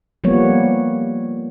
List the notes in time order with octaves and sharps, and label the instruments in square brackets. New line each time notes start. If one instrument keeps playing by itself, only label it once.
[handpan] F3 G3 A#3 B3 C#5